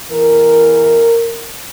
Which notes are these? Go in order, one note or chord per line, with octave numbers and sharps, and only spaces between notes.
E2 E3 A#4